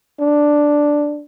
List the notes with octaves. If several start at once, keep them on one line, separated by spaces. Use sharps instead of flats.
D4